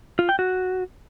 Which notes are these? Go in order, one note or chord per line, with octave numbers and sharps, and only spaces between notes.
F4
G5
F#4